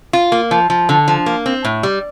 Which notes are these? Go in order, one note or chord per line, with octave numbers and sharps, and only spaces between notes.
F4
A#3
F3
F3
D3
F3
A#3
C4
A2
G3